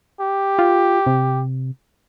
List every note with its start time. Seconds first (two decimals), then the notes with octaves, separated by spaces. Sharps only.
0.21 G4
0.59 F4
1.07 C3